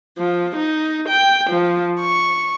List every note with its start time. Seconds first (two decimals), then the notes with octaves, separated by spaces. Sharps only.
0.18 F3
0.57 D#4
1.09 G5
1.50 F3
2.02 C#6